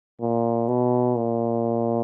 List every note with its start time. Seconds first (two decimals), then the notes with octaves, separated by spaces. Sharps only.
0.21 A#2
0.68 B2
1.16 A#2